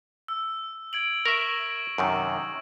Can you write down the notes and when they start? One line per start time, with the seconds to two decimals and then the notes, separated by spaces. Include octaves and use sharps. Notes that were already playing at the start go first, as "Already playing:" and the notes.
0.28 E6
0.93 G#6 D7 F#7
1.25 A#4 E5 C#6 A#6
1.98 F#2 C3 D#3